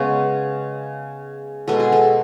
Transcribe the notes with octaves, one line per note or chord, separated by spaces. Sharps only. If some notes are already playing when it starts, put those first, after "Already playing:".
Already playing: C#3 G#3 B3 C#5
B2 G#3 B3 A4
G#4
A4